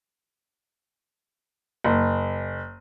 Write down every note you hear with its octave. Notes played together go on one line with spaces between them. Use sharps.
F#1